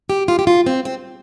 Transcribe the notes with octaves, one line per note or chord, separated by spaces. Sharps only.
G4
F4
G4
F4
C4
C4